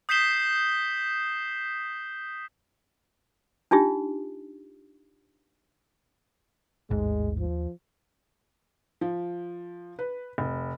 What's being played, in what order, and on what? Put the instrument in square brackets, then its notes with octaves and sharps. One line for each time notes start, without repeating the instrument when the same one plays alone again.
[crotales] D#6 G6 B6 C7 E7 G7
[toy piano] D4 D#4 F4 G4
[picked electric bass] A1 G#2 [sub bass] D#2 [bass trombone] G#3
[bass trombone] F3
[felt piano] F3
B4
F1